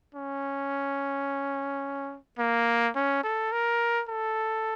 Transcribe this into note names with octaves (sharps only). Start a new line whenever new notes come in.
C#4
A#3
C#4
A4
A#4
A4